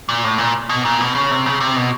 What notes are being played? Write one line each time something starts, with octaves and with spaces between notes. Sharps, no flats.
A#2
A2
A#2
B2
A#2
B2
C#3
C3
C#3
C3
B2